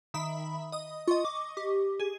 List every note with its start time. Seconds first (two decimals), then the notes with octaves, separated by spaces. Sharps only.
0.14 D#3 E5 B5
0.72 D#5 D#6
1.07 F4 D#5 C#6
1.25 D6
1.57 G4
2.00 G#4